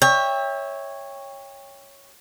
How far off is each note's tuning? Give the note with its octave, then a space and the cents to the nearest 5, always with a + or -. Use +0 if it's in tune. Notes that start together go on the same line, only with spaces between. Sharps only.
C#5 +0 E5 -20 G5 +30